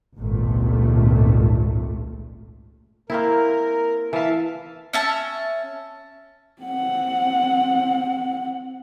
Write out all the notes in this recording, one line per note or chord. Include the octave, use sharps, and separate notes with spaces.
G#1 C#2 G2 A#2 A3
A#3 C4 E4 A#4
E3 E5 F5 A5
C#4 E5 A5
C4 F#5